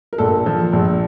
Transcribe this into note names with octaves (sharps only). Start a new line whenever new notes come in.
A#4
A#1 A4
F3
A#1